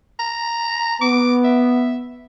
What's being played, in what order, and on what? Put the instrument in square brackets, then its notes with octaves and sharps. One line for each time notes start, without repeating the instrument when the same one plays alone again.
[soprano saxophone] A#5
[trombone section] B3 [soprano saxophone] D6
[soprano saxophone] E5